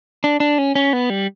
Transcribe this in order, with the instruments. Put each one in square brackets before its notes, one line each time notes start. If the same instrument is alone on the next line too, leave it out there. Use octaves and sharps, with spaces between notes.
[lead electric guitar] D4
D4
C#4
C#4
B3
G3